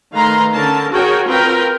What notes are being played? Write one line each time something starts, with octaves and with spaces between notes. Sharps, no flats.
D#3 A3 B4 F5 A#5 C6
D3 C#4 A#4 A5
F#4 G#4 A#4 C#5 G5
C4 F4 A#4 B4 G5